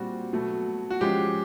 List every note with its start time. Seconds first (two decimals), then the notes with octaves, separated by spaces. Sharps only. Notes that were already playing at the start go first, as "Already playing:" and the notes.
Already playing: A#2 G3 C4 F#4
0.33 B2 F#3 A3
0.90 F#4
1.01 F3 G#3 C#4 G4